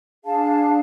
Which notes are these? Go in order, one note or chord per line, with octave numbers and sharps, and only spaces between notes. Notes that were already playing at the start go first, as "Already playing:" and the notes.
D4 G#4 F5 A5